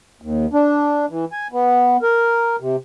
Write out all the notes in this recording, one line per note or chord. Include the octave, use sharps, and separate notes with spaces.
D#2
D4
E3
G#5
B3
A#4
C3